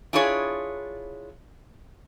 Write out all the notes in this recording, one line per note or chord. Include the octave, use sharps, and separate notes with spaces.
D4 E4 F4 G#4 C#5